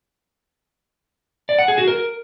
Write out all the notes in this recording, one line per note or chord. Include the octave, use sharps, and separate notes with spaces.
D5
F#5
G#4
F#4
A#4